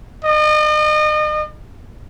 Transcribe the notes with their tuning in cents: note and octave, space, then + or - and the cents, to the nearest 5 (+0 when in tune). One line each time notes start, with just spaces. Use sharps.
D#5 -35